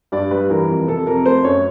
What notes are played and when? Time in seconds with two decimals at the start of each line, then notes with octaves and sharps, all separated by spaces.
0.12 G2 D5
0.31 G3 B4
0.50 E3 A#4
0.69 F2
0.88 C3 A4
1.07 F2 A#4
1.26 A3 C5
1.44 F#2 C#5